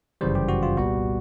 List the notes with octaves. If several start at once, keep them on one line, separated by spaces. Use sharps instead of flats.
G1 F#2 C#3 E3 G3 C5
G4
F#4
F4
C2 A#2 G3 B3 F#4